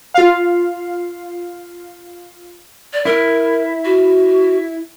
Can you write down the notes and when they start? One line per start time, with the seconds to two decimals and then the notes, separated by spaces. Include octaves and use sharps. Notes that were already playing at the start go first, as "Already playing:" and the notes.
0.14 F4 F5
2.93 D5
3.05 E4 A#4
3.85 F#4